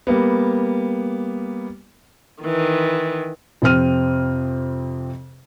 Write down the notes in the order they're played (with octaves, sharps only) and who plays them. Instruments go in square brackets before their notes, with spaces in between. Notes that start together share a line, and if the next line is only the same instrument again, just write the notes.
[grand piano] G3 A#3 B3
[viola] D#3 E3
[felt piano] F2 C3 C4 F6 D#7